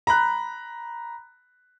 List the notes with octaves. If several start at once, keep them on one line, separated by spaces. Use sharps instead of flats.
A#5 B5 F#6